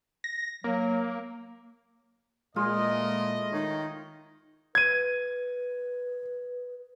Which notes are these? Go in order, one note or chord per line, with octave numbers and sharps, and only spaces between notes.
A#6
F#3 A#3
A#2 G#3 A3 E4 F4 D#5
D#3 C#5
B4 G#6 D#7